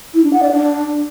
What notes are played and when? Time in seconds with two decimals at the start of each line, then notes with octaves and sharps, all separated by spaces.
0.14 E4
0.24 D4
0.33 F#5
0.43 D5
0.52 D4